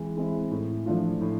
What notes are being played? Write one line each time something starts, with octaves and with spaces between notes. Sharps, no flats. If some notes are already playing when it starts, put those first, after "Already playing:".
Already playing: E3 G#3 C4 E4
G#3 C4 E4
A2
F3 A3 D4 F4
A2